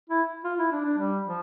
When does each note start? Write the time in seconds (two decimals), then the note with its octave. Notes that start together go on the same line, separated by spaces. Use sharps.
0.09 E4
0.44 F4
0.59 E4
0.72 D4
0.85 D4
0.98 G3
1.26 F3